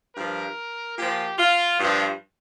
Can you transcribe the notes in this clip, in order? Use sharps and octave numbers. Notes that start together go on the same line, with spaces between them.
G2 F3 A#4
A#2 F3 G4
F4
G2 F3